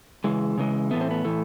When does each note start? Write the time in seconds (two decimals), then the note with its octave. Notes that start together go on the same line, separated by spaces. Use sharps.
0.24 C#3 E3 G#3
0.58 C#3 E3 G#3
0.91 A2 E3 A3 B3
1.01 C4
1.11 B3
1.25 A2 E3 A3